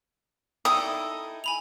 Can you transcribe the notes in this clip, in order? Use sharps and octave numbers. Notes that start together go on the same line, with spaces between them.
D#4 E4 A4 G5 D#6
G#5 B5 F7